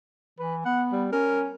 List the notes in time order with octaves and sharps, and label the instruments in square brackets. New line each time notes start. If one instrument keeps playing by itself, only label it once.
[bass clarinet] E3 [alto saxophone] B4
[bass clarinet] B3 [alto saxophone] F#5
[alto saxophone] G3
[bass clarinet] C#4 [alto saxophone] A#4